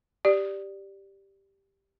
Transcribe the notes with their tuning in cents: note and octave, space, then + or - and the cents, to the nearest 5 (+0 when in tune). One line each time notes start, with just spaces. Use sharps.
G4 +0 D5 +0